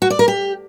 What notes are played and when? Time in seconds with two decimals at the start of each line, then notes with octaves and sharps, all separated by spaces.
0.02 F#4
0.10 D5
0.19 A#4
0.28 G4